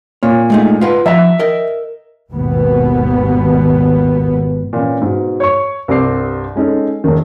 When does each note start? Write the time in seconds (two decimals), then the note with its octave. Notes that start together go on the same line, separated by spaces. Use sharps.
0.23 A#2 C#5
0.50 G#3 A3 D#4
0.81 F4 B4 F#5
1.06 F3 E5 F#5 A#5
1.39 A#4 D#5
2.30 G#1 D#2 B2 B3
4.73 A#2 E3 C#4
5.02 G#2 B2
5.40 C#5 C#6
5.88 C2 G2 G3 C4 D6 C7
6.56 G#3 C#4 D#4 A4
7.04 E1 D#3